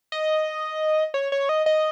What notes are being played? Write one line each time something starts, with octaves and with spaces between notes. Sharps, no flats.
D#5
C#5
C#5
D#5
D#5